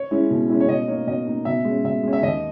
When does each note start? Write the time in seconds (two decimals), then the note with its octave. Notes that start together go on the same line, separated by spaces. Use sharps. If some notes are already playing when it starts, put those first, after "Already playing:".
Already playing: C#5
0.11 G#3 C#4 E4
0.31 B2
0.49 G#3 C#4 E4
0.60 C#5
0.68 B2 D#5
0.88 A#3 D#4 C#5
1.07 B2 D#5
1.27 A#3 D#4
1.45 B2 E5
1.65 G#3
1.70 C#4
1.84 B2 E5
2.03 G#3 C#4
2.13 E5
2.22 D#2 D#5